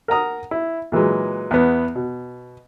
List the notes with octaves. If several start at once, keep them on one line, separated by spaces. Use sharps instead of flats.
A#4 F#5 A#5 D#6
E4
A#2 E3 F#3 G#3
E2 B3
B2